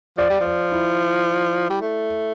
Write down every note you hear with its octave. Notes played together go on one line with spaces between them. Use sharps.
F3 D5
G3
F3 D5
E4
G3
A3